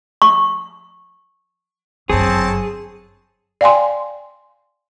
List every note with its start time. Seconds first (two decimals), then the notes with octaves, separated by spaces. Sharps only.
0.22 C#6
2.10 G1 F#2 D3 C4 G#4 C#5 A5
3.61 D5 F5 G5 G#5 C6